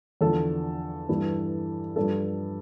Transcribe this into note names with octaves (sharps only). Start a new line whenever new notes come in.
E2 D3 F3 A4
G2 E3
G2 F3 A4